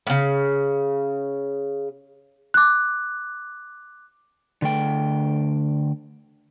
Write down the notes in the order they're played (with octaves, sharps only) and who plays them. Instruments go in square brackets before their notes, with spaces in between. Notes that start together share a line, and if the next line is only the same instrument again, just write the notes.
[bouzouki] A2 C#3
[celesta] D6 F#6
[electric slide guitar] D3 A3 G5